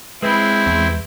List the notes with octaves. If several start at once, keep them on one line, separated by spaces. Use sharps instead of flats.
G#3 C4 E4 B4 B5
E2